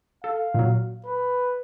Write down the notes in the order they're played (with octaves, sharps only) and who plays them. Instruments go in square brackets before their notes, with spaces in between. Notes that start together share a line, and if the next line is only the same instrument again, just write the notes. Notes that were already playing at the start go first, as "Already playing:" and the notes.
[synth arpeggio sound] A4 [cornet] F5
[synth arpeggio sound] A#2 F#3
[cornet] B4